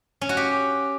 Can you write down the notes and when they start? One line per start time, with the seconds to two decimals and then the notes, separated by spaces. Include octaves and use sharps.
0.21 C#4
0.29 F#4
0.37 G4